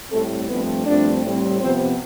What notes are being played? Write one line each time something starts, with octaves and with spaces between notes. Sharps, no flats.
A2 G3 A3 C4 A4
G2 F3 A3 B3 C4 B4
G2 F3 A3 C4 D4 D5
A2 G3 C4
C3 F3 B3 C4 C5